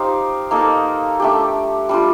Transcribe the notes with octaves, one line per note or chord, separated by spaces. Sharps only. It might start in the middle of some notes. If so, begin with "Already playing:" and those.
Already playing: D#4 G4 C5 F5
A#3 D#4 A4 D#5
A3 D4 G4
G3 D4 F4